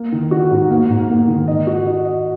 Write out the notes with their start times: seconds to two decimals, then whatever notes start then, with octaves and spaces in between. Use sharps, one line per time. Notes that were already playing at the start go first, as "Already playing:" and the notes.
Already playing: A#3
0.12 D#3
0.31 F#4
0.51 G#2
0.70 A#3
0.90 G#2
1.09 A#3
1.28 D#3
1.48 D#5
1.67 F#4
1.87 D#5
2.05 D#5